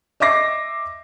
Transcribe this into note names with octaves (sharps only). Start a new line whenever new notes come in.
D#5 E5 D6 A#6 C7